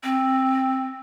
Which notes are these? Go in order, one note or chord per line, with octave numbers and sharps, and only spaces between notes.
C4